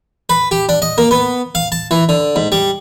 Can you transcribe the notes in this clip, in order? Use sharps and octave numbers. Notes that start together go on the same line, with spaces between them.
B4
G4
D4
D#5
A#3
B3
F5
A5
E3
D3
G#2
G3